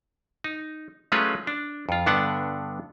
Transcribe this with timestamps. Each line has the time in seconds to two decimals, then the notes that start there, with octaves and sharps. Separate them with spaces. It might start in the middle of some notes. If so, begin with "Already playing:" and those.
0.44 D#4
1.12 F#3 G#3 A3 C#4 F4 B4
1.47 D4
1.89 F2 F4
2.06 G2 D3 B3 D4 F#5